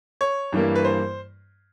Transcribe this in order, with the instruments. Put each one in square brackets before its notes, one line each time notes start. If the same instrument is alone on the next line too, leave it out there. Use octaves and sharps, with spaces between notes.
[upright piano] C#5
[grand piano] G2 E3 G3 A#3
[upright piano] B4
C5